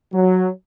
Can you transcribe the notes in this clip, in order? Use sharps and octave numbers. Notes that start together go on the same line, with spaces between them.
F#3